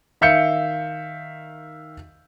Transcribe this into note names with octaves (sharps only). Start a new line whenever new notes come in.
D#3 E5 F5 G6 C#7